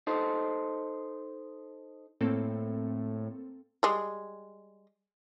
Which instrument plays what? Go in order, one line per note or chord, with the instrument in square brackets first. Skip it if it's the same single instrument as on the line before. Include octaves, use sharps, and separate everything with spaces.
[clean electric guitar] D#4 A4 C5
[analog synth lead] A2 [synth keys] A#3 C4 A4
[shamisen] G3 G#3